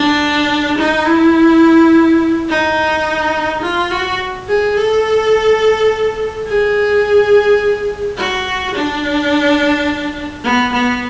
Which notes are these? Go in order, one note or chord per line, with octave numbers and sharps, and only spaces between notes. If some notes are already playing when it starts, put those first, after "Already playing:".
Already playing: D4
D#4
E4
D#4
F4
F#4
G#4
A4
G#4
F#4
D4
B3
B3